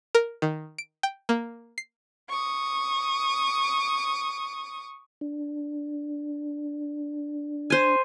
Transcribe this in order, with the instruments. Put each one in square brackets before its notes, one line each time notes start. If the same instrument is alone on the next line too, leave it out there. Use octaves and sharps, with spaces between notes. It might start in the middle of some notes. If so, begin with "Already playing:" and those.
[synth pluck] A#4
D#3
D7
G5
A#3
C7
[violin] C#6 D#6
[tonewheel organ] D4
[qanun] C5 G#5